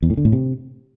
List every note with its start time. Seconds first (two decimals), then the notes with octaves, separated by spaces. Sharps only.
0.02 E2
0.10 A2
0.17 D3
0.25 A2
0.32 C3